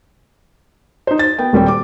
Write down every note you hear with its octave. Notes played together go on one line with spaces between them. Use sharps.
D#4 C5
A6
B3 G5
D#1 G3 C4 G5
D6